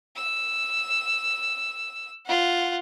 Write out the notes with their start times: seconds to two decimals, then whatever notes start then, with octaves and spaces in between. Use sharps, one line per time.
0.17 E6
2.26 F4 F#5